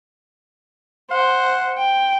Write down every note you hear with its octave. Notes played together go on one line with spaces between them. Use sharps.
C5 F#5
G5